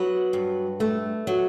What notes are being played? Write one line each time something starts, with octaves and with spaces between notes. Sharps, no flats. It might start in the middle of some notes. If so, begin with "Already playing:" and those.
Already playing: F#3 B4
G2
A3
F#3